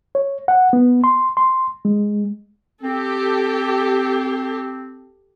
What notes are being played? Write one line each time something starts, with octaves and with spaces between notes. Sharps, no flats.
C#5
F#5
B3
C6
C6
G#3
C4 G4 A4